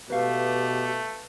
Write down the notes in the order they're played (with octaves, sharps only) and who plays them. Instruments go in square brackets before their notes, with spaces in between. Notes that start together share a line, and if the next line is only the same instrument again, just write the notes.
[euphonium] B2 [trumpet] A3 [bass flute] G4 [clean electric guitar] B4 E5 F5